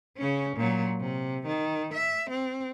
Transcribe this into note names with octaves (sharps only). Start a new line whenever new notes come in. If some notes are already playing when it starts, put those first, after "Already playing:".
C#3 C#4
A#2 F#3
C3
D#3
E5
C4